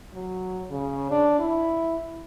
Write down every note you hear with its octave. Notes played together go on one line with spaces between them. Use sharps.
F#3
C#3
D4
E4